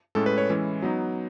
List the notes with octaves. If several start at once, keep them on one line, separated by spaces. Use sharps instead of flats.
A2 G#3 C#4 A4
B4
C#5
E3 G#3 C#4 E4
F#3 B3 D#4